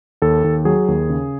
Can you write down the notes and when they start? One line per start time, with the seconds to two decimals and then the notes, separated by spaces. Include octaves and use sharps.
0.22 D#2 A4
0.44 D#2
0.65 F#3 G#4
0.88 D#2
1.10 C#3